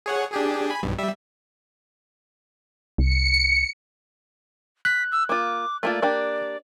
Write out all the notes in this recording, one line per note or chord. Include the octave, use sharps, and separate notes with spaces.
G#4 C#5 F#5
D4 G4 G#4
G#5 B5
B1 G2
G3 E5
C2 C#7
F#6 B6
E6
A#3 F4 D6
A3 A#3 F4 D5
A#3 D4 G4